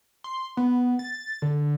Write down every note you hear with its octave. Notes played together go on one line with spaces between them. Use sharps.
C6
B3
A6
D3